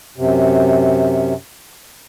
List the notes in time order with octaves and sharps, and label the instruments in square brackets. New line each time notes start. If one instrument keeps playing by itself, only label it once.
[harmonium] F#2 C3